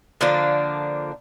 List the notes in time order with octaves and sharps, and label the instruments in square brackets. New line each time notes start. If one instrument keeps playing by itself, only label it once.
[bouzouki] D3 F3 A#3 D4